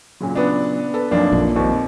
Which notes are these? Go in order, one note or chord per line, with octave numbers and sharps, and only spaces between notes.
A#2 C#3 F#3
B3 D4
A4 B4
F#1 B1 F2 A#3 D4
A#1 A#2
D#2 C4